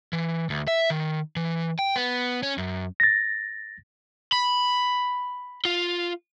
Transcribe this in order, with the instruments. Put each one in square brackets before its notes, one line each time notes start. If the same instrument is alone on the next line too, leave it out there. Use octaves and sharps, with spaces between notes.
[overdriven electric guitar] E3
D2
E5
D#3
E3
G5
B3
C#4
F#2
[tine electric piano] A6 A#6
[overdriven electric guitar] B5
F4